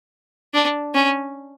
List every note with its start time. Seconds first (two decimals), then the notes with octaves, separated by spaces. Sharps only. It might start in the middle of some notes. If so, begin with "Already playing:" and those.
0.54 D4
0.94 C#4